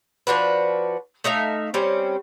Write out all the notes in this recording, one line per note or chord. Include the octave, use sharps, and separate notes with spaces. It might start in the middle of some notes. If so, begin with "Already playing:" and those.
F3 D4 F#4 B4
A3 D#4 E5 F5
G3 C4 C#4